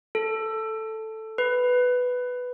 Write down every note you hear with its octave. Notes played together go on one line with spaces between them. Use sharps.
A4
B4